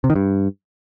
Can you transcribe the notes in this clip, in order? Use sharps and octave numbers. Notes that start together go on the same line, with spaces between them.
C3
D#3
G2